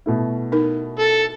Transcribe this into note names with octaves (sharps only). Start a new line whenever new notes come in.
B2 A3 E4
D#4 A#4
A4